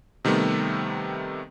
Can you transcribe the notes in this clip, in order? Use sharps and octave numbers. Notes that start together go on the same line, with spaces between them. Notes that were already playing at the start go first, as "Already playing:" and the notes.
C3 D#3 G3 A3 B3